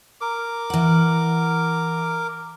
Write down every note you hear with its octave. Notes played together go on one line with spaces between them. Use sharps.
A#4 D6
E3 F#5